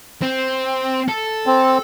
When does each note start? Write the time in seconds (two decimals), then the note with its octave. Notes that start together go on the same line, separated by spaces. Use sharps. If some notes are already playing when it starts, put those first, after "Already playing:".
0.22 C4
1.08 A4
1.46 C4